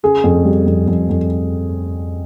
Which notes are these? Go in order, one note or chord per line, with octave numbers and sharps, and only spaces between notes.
C#3 G#4
F2
G3
F2
F2
F2